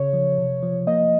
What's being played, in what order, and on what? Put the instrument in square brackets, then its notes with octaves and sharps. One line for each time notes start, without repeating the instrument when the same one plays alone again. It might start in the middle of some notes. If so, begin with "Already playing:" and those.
Already playing: [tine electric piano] C#3 [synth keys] C#5
[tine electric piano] F3
C3
F3
[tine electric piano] A#3 [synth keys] D#5